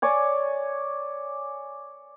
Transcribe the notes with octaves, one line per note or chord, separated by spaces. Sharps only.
C#5 D5 G#5